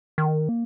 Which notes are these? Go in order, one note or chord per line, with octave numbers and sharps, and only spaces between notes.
D#3
A#3